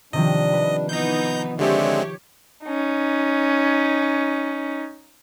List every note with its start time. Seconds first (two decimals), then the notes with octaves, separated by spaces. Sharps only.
0.13 C3 D#3 F3 G3 D4 D#5
0.53 B4
0.89 E3 B3 D#4 A#5 G6
1.59 D3 G#3 C4 D4 G4 C#5 E5 A5
2.64 C#4 D#4